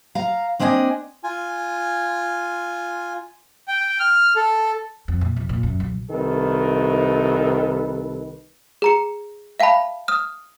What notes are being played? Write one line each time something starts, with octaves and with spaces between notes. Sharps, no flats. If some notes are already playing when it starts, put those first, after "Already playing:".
F5 A#5
A#3 C4 D4 D#5 F5 G#5
F4 G#5
G5
F6
A4
F2
A#2
F1
A#2
F#2
B1
C2 D#3 A4 B4
G#4 A#5 C#7
E5 F5 G5 A5 B5
D#6 F6